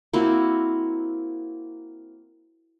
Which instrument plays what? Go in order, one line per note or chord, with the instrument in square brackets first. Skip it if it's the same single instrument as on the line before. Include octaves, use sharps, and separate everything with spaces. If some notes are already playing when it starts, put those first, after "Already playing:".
[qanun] A#3 C4 E4 F#4